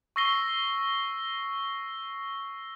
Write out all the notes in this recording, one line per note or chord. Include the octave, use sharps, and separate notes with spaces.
C#6 E6 A#6 C7 G7